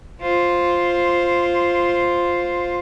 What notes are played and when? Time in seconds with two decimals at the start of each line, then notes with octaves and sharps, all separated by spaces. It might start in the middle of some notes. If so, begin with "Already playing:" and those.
0.22 F4 C5